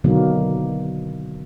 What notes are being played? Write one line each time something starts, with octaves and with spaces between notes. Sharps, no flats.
B2 D3 D#3 F#3 A#3